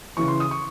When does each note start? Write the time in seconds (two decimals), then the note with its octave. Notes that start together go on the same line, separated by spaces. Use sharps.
0.17 C#3 E3 C#6
0.28 C6
0.40 D#6
0.51 C#6